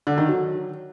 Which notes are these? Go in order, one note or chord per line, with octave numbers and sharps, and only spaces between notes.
D3
D#3
F#3